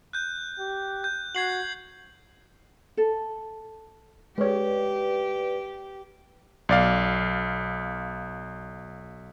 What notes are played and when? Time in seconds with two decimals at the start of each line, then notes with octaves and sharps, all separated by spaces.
0.13 F#6 G6
0.59 G4
1.04 G6
1.35 F#4 G#6 C7 F#7
2.97 A4
4.38 G#3 G4 B4 C#5 D5
6.69 B1 D5 F5